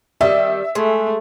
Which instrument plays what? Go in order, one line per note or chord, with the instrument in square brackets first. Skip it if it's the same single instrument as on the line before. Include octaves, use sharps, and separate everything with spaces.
[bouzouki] D#3 G3 D#5 [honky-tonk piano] E5
[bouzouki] G#3 [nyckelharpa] A3